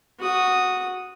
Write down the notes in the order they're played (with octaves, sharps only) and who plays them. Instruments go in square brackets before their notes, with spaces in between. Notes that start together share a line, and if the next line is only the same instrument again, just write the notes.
[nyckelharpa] F#4 D#6